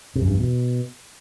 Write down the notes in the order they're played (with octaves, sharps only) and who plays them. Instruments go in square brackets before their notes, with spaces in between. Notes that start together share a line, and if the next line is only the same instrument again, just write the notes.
[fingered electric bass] C3
F#2
G2
E2
B2